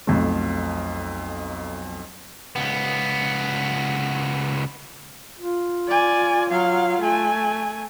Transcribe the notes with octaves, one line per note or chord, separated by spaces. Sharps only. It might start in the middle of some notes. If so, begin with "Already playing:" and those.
B1 F2 A3
C#2 B3
F4
D5 G#5
F#3 F5
A3 G#5